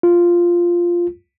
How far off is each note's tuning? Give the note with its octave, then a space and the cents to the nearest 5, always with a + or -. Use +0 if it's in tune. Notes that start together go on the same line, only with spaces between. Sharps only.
F4 -5